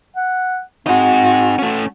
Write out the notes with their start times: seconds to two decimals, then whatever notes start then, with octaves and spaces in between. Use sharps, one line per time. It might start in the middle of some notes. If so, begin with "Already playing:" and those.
0.16 F#5
0.87 C4 D#4 F#4 G#4
1.59 A3 C#4